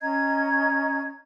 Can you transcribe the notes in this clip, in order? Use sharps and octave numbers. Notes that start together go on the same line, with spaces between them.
C#4 D#5 A#5 G#6